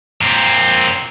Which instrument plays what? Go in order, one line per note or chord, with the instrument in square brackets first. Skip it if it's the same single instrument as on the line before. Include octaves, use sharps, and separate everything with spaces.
[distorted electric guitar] A#2 C4